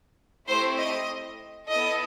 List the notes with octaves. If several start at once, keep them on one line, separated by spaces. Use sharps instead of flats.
A3 C4 E4 G4 C5
D#5
B3 E4 A4 D#5